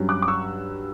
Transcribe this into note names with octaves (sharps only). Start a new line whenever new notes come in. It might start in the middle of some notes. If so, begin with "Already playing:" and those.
Already playing: G2 F#3 C#4
D6 F#6
D6
C#6 E6